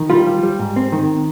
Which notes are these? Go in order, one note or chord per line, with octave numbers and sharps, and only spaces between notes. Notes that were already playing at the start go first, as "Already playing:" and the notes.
Already playing: D#3
G3 F4
G3
G3
G#2
C4
D#3